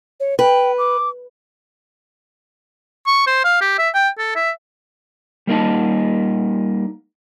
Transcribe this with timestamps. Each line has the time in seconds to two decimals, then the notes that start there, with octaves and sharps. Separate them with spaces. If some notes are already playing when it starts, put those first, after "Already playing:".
0.20 C#5
0.39 B4 G5
0.78 D6
3.07 C#6
3.27 C5
3.44 F5
3.61 G4
3.78 E5
3.95 G5
4.18 A4
4.36 E5
5.47 G3 A#3 D#4 A5